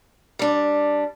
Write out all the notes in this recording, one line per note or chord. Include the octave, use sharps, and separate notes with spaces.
G3 D4